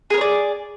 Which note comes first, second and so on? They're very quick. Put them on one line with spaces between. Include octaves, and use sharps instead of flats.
G#4 A#4 C#5 D5